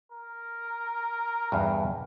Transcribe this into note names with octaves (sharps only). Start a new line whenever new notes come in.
A#4
E2 G2